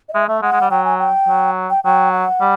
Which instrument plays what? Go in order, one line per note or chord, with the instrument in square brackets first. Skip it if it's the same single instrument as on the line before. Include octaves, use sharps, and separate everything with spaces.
[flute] D#5
[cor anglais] G#3 [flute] E5
[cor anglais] A3 [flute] E5
[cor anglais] G#3 [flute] F#5
[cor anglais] G#3
G3
[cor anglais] F#3 [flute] G5
[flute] G#5
G5
[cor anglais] F#3
[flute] G5
[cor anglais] F#3 [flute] G5
[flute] F#5
[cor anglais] G3